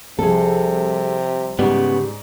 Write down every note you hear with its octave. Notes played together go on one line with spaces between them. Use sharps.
C2 C3 F3 G#4 A4
G#2 C#3 G3 G#3 B3